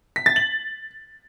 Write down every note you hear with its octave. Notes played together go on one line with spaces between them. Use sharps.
B6
A6
F#7